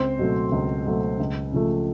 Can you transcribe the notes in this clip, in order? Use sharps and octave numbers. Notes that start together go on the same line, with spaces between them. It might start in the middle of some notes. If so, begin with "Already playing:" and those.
Already playing: C#2 C4 C5
B2 F#3 A3
C#2
B2 F#3 A3
C#2
C#3 F3 A3